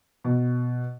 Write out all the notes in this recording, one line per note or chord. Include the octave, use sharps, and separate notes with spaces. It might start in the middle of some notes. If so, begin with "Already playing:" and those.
B2